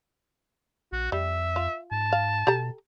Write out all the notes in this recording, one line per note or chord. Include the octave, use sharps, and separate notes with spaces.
A#1 F#4
F2 G3 E5
F4
G#2 A5
F5
B2 G4 A4 A#5